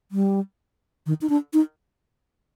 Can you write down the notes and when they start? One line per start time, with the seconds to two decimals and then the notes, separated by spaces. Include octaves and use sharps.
0.12 G3
1.06 D#3
1.21 D#4
1.29 D4
1.53 D#4